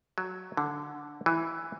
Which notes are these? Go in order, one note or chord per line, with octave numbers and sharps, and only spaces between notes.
F#3
D3
E3